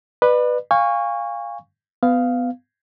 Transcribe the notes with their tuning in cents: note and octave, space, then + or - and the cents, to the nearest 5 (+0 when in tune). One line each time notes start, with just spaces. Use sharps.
B4 -5 D5 +40
F5 +0 G#5 -35 C#6 +0
B3 +20 F5 +0